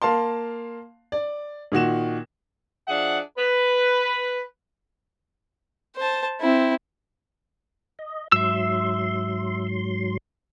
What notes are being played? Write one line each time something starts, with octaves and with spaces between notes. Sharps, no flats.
A#3 F5 A5 C6
D5
A#2 D#3 F#4 E7
F3 D4 G#4 E5 F#5
B4
C5 A5
C4 E4
D#5
G#2 F#3 E5 C6 E6